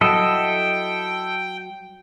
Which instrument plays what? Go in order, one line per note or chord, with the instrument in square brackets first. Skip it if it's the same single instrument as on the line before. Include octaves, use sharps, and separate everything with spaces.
[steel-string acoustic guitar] F#3 [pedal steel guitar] E4 A4 D#5 [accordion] G5